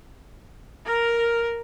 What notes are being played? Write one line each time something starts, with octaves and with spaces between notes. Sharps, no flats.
A#4